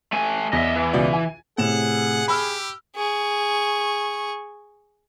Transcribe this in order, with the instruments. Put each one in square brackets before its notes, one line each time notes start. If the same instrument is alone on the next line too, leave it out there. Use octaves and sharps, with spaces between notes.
[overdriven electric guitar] A3 G#5
[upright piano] E2 [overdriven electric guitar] D#5 E5
[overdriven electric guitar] E3
[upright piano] C#2 B2 D5
G#5
[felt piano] A2 C3 E7 [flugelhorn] G#4 [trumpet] F#5
[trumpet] G4 [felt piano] B5 E6 F6
[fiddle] G#4 C#6